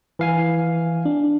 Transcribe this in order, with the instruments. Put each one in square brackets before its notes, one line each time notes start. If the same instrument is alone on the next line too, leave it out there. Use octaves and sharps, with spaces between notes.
[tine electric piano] E3 F5 G#5
[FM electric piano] D4